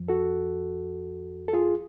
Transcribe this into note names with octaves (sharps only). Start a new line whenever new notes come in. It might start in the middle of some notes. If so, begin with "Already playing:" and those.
Already playing: F2 F3
F#4 A4
A4
F4 G#4